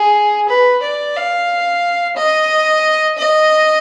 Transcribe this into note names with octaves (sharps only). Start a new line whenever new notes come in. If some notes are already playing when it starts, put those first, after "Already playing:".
Already playing: G#4
B4
D5
F5
D#5
D#5